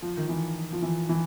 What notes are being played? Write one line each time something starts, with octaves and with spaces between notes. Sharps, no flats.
F3
D#3
E3
F3
E3
E3